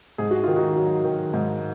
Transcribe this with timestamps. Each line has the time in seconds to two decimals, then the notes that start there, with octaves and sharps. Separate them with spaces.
0.18 G#2 G#4
0.31 F#4
0.43 D#3 F4
0.56 D#4 F#4
0.76 F#3
1.05 D#3
1.33 G#2